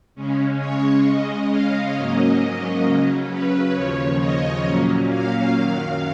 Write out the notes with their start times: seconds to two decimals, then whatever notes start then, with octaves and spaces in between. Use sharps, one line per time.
0.15 C#3 G#3 C#4
0.59 C#5
1.05 C#3 G#3 C#4 D#5
1.49 F5
1.94 G#2 F#3 A#3 C#4 D#5
2.84 C#3 F#3 C#4
3.29 B4
3.74 D#2 C#3 F3 C#5
4.19 D#5
4.63 A#2 F#3 A#3 C#4
5.09 F5
5.53 F#2 D#3 F#3 F5